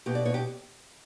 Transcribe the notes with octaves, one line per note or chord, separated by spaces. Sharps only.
B2 G4
D5
B2 C#5
G4